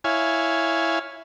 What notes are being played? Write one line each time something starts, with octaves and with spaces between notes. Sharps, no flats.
E4 C#5 F5 G#5